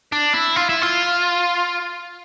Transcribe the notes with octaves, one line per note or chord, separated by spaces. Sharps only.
D4
E4
F4
E4
F4